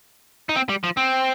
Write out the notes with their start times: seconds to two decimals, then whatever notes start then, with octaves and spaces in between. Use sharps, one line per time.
0.49 D#4
0.56 C4
0.69 G3
0.84 F3
0.97 C4